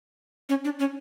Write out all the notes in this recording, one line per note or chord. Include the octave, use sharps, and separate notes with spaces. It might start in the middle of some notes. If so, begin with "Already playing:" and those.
C#4
D4
C#4